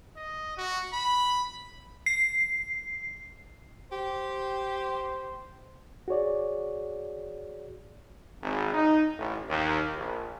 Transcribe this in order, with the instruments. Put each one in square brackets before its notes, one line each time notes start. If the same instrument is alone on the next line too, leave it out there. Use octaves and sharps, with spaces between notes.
[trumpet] D#5
F#4
B5
[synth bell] C7
[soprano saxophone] G4 [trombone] C5
[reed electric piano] F#4 G#4 C#5 D5
[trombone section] G#1
D#4
A1
D#2
A#1